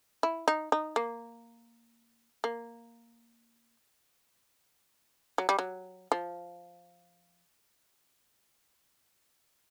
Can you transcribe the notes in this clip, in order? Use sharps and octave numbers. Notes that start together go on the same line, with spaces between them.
E4
D#4
D#4
A#3
A#3
F#3
G3
F#3
F3